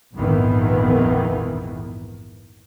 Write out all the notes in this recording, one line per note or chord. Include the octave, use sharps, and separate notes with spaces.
A#1 F2 G#2 D#3 E3 B3